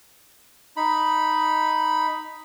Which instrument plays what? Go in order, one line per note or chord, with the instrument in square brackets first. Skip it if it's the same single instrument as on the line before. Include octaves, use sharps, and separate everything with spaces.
[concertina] D#4 B5